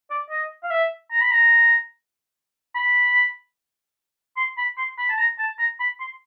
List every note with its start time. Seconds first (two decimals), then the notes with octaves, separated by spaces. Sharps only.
0.10 D5
0.30 D#5
0.64 F5
0.71 E5
1.11 A#5
1.21 B5
1.31 A#5
2.75 B5
4.37 C6
4.58 B5
4.78 C6
4.98 B5
5.09 A5
5.18 A#5
5.39 A5
5.59 A#5
5.80 B5
6.00 C6